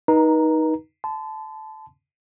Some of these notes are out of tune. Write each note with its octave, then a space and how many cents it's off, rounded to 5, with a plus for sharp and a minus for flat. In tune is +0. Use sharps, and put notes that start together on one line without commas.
D#4 +10 B4 -40 A#5 -5
A5 -15 C6 -40